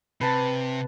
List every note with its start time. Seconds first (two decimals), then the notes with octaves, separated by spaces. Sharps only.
0.21 C3 B4 A5